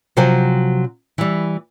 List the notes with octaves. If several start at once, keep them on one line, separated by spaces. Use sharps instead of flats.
C3 F3 F#3 C5 G#5
E3 G3